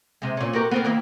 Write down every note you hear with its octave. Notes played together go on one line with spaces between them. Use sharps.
C3 G#3
A#2 C#4
F#4 G4 A#4
B3 C4 A#4
D#3 A#3 E4